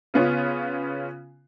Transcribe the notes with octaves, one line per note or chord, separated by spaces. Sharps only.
C#3 B3 C#4 F4